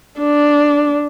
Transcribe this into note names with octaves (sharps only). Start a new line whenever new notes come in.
D4